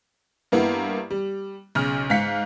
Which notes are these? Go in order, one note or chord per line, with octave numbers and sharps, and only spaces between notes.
G2 A#3 B3 E4
G3
B1 C#3 F6
G#2 F5 B6 C#7